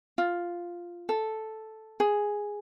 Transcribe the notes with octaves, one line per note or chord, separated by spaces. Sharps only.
F4
A4
G#4